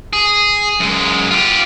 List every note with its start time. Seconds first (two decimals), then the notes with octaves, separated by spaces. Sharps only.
0.13 G#4
0.80 F#2 G#3
1.31 F4 G4